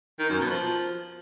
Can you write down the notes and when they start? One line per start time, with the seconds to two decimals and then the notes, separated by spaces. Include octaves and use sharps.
0.19 D#3
0.30 F#2
0.40 B2
0.51 F3